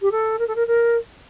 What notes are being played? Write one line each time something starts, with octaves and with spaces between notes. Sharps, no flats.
G4
A4
A#4
A4
A#4
A#4